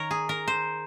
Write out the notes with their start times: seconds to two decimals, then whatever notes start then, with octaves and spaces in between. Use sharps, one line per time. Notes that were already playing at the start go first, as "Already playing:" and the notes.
Already playing: D#3 A#4 C#5
0.11 G#4
0.29 A#4
0.48 C5